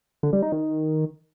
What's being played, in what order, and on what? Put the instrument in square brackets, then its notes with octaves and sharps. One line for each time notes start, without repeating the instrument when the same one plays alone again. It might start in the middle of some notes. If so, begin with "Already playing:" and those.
[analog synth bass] D3
G3
D#4
D#3